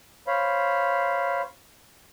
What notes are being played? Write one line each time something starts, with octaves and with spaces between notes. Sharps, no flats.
C5 C#5 F5 B5